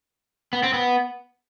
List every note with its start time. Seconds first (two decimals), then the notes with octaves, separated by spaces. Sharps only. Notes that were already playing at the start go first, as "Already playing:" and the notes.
0.53 B3
0.63 C4
0.73 B3